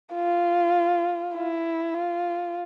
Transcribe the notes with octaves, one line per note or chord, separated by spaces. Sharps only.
F4
E4
F4